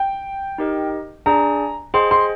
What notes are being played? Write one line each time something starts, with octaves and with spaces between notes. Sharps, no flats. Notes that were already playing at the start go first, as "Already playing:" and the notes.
Already playing: G5
D#4 G4 A#4 D#5
D4 G#4 D5 G#5 A#5
G#4 C5 D#5 G5 C6
C6